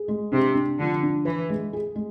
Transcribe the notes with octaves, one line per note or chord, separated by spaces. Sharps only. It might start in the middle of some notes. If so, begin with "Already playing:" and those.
Already playing: G#4
G#3
C3 D4
D4
D3 F3
D4
E3 B4
G#3
G#4
G#3